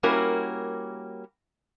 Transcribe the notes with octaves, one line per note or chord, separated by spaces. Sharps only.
G3 A#3 C#4 E4 F#4 A#4